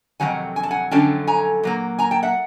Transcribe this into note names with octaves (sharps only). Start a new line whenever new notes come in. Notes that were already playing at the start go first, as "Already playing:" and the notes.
F2 C3 D#3 F#3 F#5 G#5
G#5
A5
F#5 G#5
F2 D3 F#3 A3 C#4 G5 A5
G#5 A#5
A#2 F#3 A#3
G#5 A#5
G5 A5
E5 F#5